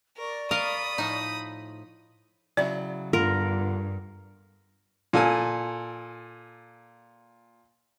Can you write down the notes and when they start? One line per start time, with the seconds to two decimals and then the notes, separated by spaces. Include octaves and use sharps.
0.17 A#4 D5 C#6
0.51 A#4 D#5 F5 B5 D#6
0.98 A2 F3 D#4
2.57 C#3 F#3 E4 D5
3.13 G2 D3 B3 F4 A#4
5.13 A#2 A4 G#5